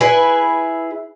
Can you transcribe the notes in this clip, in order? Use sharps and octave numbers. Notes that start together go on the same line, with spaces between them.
E4 G#4 B4